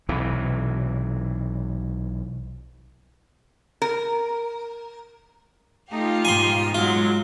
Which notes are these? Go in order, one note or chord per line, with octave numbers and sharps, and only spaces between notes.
B1 C3 E3
A#4
A3 D#4 F4 G4 F5
G#2 B2 G#5 C6
F#3 G#3 F4